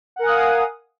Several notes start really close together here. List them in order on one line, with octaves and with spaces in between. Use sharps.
F#5 A#4 G#5 D#6 F5